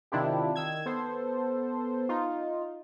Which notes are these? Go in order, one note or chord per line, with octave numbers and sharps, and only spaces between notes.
C3 D#3 D4 E4 F4 G4
D#3 E6 G#6
B3 A4 C5
D#4 F4